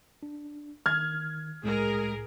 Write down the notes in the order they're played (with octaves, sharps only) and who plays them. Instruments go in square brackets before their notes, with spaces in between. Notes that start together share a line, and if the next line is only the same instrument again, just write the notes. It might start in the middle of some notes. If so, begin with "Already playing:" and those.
[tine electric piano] D4
[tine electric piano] D#3 [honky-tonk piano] F6 G#6
[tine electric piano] C2 A2 [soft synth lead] G#3 [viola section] G#4 A#4